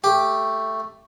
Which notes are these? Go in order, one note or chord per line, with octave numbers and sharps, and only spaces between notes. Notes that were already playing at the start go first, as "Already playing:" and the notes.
A3 G4